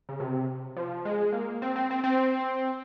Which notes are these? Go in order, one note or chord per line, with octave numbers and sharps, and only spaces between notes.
C#3
C3
F3
G#3
A#3
C4
C4
C4
C4